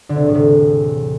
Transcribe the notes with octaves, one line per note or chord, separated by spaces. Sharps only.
D3
C3
E2
A2
C3